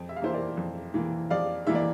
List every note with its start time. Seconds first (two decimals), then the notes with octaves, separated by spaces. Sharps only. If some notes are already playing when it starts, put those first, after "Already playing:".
Already playing: F2
0.09 E5
0.16 F5
0.22 E3 A#3 C5 E5
0.34 A#4 D5
0.57 F2
0.94 E3 A#3
1.30 F2 D5 F5
1.67 E3 A#3 E5
1.75 D5